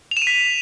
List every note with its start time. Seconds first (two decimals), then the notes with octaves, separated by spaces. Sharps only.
0.11 F7
0.17 E7
0.22 D#7
0.27 B6